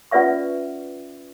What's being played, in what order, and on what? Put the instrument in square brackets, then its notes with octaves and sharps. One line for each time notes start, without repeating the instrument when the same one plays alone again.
[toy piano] C#4 F4 B4 D5 E5 C#6